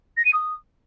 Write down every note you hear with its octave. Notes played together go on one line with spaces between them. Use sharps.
A#6
D#7
D#6